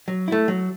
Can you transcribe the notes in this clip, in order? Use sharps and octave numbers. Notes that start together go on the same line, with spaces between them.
F#3
A3 E4
F#3